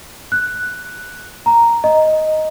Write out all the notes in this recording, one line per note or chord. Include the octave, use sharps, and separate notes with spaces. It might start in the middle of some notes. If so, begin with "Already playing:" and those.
F#6
A#5
D#5